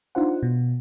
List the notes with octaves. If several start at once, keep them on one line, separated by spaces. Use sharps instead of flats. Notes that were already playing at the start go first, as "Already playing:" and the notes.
D4 D#4 F4 C5 F#5
B2